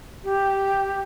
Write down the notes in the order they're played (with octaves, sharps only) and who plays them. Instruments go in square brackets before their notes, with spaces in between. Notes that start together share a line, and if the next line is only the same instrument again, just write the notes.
[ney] G4